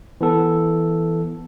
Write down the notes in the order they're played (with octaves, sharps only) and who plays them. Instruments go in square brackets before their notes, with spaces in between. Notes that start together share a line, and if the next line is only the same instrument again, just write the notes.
[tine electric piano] E3 B3 A4